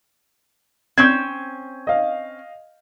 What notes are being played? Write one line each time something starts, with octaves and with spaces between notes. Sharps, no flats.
C4 C#4 G6 G#6
D#5 F5